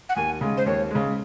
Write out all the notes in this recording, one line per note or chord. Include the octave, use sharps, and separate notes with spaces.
F#5
D#2 G#5
C#3 G#3
C5
D#2 C#5
C#3 G#3